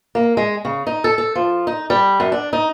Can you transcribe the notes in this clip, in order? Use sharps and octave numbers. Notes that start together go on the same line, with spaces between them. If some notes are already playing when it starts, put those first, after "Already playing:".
A#3
G#3
C#3
D#4
A4
A4
F3
D#4
G3
F#2
D4
D#4